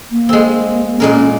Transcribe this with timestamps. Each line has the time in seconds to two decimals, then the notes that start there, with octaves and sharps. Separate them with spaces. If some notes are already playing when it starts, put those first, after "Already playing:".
0.11 A#3
0.29 G#3 C4
1.00 A#2 G#3 C#4 A#4